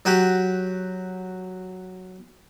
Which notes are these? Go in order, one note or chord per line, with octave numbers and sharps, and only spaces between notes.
F#3 F#4 G4